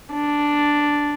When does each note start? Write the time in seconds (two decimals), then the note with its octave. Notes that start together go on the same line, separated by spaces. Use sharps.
0.13 D4